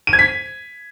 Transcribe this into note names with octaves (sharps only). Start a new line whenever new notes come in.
D#7
G#6
B6